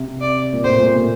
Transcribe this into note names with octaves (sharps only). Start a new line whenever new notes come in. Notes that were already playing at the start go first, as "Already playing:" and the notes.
Already playing: C3
D5
A#2
A2 C5
A#2
C3